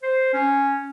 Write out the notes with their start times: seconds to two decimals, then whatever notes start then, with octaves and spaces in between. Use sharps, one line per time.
0.03 C5
0.33 C#4